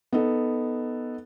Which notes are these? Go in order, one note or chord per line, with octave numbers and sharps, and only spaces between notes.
B3 D#4 A4